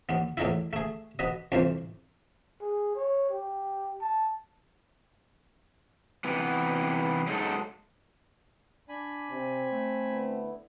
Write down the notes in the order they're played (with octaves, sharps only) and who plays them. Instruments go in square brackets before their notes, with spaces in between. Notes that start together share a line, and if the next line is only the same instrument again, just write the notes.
[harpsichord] D#2 B3
E2 A2 D#3 D#4 E4
A3 G#4
B2 B4 D#5
C2 F2 E3 C5
[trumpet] G#4
C#5
G4
A5
[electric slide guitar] C3 E3 B3
F#3 G#3 D#4 G#4 A4
[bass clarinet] D4 [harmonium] D5 [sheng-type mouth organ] G#5 B5
[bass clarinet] C3 [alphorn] C4
[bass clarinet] A3
[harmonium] D3 B3 E4